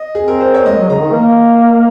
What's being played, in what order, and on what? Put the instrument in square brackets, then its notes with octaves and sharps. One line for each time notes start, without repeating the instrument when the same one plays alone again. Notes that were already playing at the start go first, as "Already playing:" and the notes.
Already playing: [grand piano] D#5
G#4
[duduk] C4
[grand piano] A#4
C5
C#5
[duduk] G#3 [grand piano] D#5
[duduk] F#3
[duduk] C#3 [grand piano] A#5
[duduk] D#3
A#3